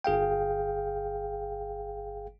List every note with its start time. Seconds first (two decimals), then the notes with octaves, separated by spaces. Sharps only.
0.04 G1 G#4 F5 G5